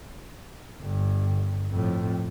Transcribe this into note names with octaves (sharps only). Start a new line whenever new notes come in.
G1
F2 A2